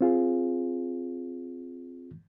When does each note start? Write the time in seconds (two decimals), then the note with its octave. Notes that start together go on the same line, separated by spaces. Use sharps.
0.01 C4 F4 G#4